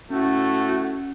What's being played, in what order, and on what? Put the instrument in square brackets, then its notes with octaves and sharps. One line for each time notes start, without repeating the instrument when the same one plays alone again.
[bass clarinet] A2 [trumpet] A3 [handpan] C#4 [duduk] F#4